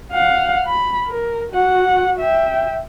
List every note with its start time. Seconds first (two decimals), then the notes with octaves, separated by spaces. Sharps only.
0.12 F5 F#5
0.66 B5
1.07 A#4
1.52 F#4 F#5
2.19 E5 G5